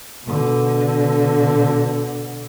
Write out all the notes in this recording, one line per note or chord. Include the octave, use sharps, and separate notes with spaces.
B2 D3